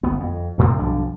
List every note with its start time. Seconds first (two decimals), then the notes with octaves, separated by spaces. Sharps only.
0.03 G1 B3
0.20 F2
0.58 D2 A2 C3 C4
0.79 B1 G2 F3 D4